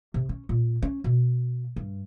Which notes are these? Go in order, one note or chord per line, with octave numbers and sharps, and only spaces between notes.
C3
C#4
A#2
C#4
B2
G2